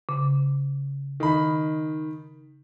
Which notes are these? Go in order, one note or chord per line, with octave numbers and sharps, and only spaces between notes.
C#3
D#3 B5